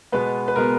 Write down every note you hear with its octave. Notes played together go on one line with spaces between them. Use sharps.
B2 G#3 B3 B4
B4
B2 G#3 B3 A#4